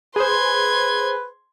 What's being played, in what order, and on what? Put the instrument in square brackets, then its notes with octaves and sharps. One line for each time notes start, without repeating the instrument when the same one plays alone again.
[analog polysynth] G#4 C5 [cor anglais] B4 [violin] C6 G#6